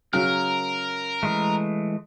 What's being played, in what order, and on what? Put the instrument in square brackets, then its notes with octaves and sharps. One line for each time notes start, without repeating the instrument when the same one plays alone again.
[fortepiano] C#3 F#3 [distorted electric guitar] A#4 [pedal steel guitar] F6
[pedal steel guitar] E3 G#3 A3